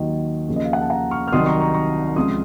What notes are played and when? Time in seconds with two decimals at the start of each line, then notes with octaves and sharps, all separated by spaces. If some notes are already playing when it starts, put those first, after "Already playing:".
Already playing: D#2 D#3 F#3
0.48 D#2 C#3 F3
0.56 D#5
0.65 F5
0.73 F#5
0.81 A5
0.90 F#5 A#5
1.11 C#6 F6
1.28 F6
1.32 C2 C3 D#3 F#3 C6 D#6
1.46 A#5 C#6
1.60 A#5 C#6
1.74 A#5 C#6
2.16 C#2 C3 F3 C6 D#6